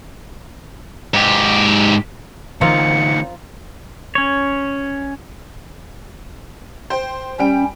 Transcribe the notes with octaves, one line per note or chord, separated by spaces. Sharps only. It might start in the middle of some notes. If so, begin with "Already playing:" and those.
G#2 G4
D2 D3 E3 A#3 C4 D#4 F4 C#7
C#4 C#5
C5 G5
G3 C#4 G5 D7